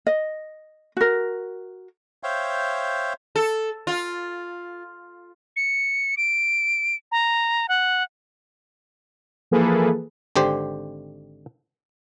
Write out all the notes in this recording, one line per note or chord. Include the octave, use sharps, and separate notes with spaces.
D#5
F#4 A#4
C5 C#5 E5 F5 G5
A4
F4
C#7
D7
A#5
F#5
E3 F3 A#3 G#4 A4 B4
G#1 D3 G4 C5